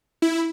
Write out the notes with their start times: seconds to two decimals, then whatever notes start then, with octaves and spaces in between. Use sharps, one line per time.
0.22 E4